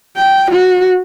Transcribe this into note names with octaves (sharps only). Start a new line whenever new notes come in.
G5
F#4